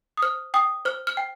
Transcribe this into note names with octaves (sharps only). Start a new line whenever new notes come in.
D#6
C5 F6
G5 D#6
C5 F6
F6
G5